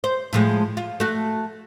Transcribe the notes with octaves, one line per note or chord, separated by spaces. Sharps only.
C5
A2 F3 G#3
F4
A3 F#4